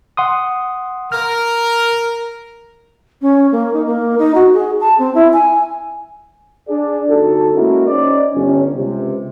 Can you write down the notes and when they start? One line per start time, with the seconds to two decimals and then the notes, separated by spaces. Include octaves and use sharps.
0.17 F#5 C6 D#6
1.12 A#4 F6
3.22 C#4
3.52 A#3
3.73 D#4
3.86 A#3
4.19 D#4
4.35 F#4
4.54 G#4
4.81 A5
4.99 C4
5.15 E4
5.33 G#5
6.68 D4 G#4 D5
7.09 G1 D2 D#4 F#4 A4
7.55 G#3 A#3 C#4 E4 F#4 A#4
7.87 C#4 D#4 C5 D5
8.33 G1 C#4
8.76 C#2 C3